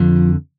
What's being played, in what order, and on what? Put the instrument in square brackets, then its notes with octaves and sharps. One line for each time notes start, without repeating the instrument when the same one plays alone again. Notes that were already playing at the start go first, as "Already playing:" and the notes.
Already playing: [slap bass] F2 D3 F3